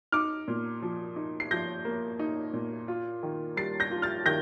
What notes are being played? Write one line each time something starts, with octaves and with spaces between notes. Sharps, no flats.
D#4 D6 F6
A#2
F3
D#4
C7
F3 G6 A#6
A#3
D#4
A#2
F4
D#3
G3 A6 C7
G6 A#6
F4
F6 A6
D#3 G6 A#6